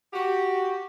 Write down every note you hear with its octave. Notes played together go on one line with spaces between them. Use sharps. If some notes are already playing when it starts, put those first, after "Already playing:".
F#4 G4